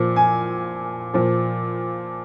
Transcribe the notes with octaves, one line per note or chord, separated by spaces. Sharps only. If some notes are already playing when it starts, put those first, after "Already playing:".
Already playing: A#2 F3
G#5
A#2 F3